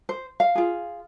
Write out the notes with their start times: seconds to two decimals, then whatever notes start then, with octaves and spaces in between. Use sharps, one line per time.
0.09 C5
0.40 F5
0.55 F4 G#4